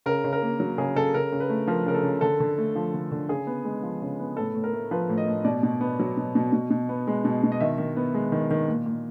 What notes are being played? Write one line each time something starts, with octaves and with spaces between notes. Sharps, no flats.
C#3 A#4
C#3
A#4
A#3
F#3
C#3 G#4
C#3 A4
C#3 A#4
C#3
B4
A3
F3 A#4
C#3 A#4
A4
C#3
D3 A4
D3
A3
F3
D3
D3
C#3 G#4
B3
G#3
F3
C#3
B3
A2 A4
A2
A#4
A3
F3 B4
A2
D#5
A2
B2 D5
B2
B3
F#3
B2
B2
B2
B2
B3
G#3
B2
B2
D#5
D#3 E5
D#3
B3
G#3
D#3
D#3
A#2
A#2